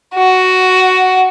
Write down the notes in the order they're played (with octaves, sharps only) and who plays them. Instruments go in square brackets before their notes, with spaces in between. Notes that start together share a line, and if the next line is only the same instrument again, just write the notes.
[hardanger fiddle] F#4